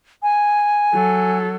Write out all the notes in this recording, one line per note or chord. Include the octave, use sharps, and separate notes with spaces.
G#5
F#3 A4